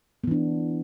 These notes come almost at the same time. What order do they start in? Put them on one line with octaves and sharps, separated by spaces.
B3 E3 D4